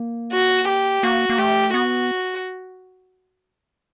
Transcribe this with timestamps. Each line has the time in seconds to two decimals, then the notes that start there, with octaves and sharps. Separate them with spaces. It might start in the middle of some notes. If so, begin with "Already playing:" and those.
Already playing: A#3
0.32 F#4
0.68 G4
1.03 A#3 F#4
1.30 A#3
1.38 A3 G4
1.74 B3 F#4